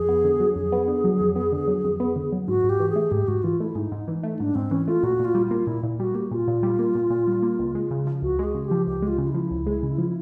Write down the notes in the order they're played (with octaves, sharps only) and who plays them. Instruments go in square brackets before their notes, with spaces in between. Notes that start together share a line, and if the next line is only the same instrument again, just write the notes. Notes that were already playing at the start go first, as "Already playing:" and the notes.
Already playing: [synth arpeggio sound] F2 [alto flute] G#4
[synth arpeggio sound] B3
D3
F#3
[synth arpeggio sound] F2 [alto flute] G#4
[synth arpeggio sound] B3
D3
F#3
F2
B3
D3
F#3
F2
B3
D3
F#3
[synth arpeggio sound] G#2 [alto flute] F#4
[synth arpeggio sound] G#2
[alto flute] G4
[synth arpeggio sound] E3
[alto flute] G#4
[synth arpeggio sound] A3
[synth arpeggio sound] G#2 [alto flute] G4
[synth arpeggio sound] G#2 [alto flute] F#4
[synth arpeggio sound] E3 [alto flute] F4
[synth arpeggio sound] A3 [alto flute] E4
[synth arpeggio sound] G#2 [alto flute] D#4
[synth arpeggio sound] G#2
E3
A3
[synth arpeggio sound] G#2 [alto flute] D4
[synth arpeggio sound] G#2 [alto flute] C4
[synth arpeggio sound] E3 [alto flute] C#4
[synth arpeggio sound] A3 [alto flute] F4
[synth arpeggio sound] A#2 [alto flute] F#4
[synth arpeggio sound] A#2
[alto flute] F4
[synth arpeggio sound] G3
[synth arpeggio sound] A#3 [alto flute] F4
[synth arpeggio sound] A#2 [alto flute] E4
[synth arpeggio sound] A#2
[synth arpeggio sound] G3 [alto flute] F#4
[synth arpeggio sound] A#3 [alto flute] G4
[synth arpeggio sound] A#2 [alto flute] F4
[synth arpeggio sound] A#2
G3
A#3
A#2
A#2
G3
A#3
C#2
G#3
C#3
F3
[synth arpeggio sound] C#2 [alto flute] F#4
[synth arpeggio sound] G#3 [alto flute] G#4
[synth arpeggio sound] C#3
[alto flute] G4
[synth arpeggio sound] F3
[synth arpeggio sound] C#2 [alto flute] G4
[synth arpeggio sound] G#3
[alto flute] F4
[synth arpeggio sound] C#3 [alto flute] F4
[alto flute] E4
[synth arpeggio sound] F3
C#2
G#3
C#3
F3